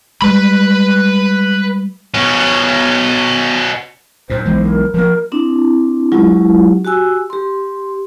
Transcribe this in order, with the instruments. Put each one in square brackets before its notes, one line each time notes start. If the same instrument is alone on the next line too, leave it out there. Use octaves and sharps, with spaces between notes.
[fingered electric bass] G3 G#3 [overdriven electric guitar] B4 B5
[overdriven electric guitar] B2 C#4
[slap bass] F#2 A#2 [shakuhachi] C5
[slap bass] B1 E3 G#3
[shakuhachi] A#4
[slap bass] F3 A#3 [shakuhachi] A#4
[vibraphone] C4 D4 E4
F#3 G#3 C#4 E4 F4 G4
F#4 G4 G#5 E6
G4 C6